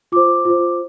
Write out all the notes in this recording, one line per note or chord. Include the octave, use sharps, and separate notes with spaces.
F4 C5 D6
F4 C5